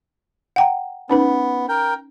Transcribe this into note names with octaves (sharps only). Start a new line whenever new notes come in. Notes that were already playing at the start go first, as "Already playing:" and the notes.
F#5 G5 A#5
B3 C#4 D#4 B4
A#4 G5